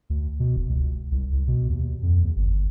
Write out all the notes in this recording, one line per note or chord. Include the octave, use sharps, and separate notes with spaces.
D2
B2
E1
C#2
C2
C2
B2
D#2
F2
D#2
G1